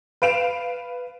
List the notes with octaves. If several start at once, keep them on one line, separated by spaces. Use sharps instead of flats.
B4 F5 D7 E7 F7